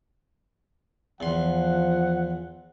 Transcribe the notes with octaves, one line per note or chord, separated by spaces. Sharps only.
E2 F3 F#5 C6